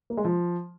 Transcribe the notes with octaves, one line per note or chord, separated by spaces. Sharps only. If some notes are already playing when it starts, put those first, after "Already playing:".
A#3
G#3
F3